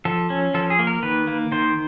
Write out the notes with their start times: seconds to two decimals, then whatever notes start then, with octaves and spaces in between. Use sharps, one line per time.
0.05 F3 A4
0.30 C#4
0.54 F3 A4
0.70 G#4
0.79 A#3
0.87 A#4
1.03 D#3 B4
1.27 A#3
1.52 D#3 C5